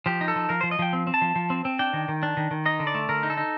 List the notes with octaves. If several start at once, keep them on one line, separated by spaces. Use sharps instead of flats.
F3 G4
D#4
A4
F3
F3 A#4
F3 C5
D#5
F3 G5
C4
C4
A5
F3
F3
C4
C4
D4 G5
D#3
D#3
D4
D#3
D#3
D#4 D#5
D3
D5
A3
D3 A#4
D#4
A4
D#4